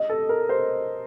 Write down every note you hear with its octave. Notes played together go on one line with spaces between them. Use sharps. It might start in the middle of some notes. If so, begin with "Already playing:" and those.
Already playing: D#5
A4
A#4
C5